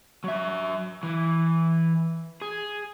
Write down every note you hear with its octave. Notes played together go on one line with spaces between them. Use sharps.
F#3 E5
E3
G#4